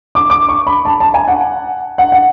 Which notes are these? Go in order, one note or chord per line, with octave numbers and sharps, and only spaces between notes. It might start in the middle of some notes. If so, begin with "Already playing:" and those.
D6
D6
C#6
B5
A5
A5
G#5
F#5
F#5
F#5